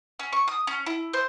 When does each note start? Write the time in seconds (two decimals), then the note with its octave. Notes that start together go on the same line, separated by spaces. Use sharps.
0.19 C#4
0.33 C#6
0.48 D#6
0.67 C#4
0.86 E4
1.13 C5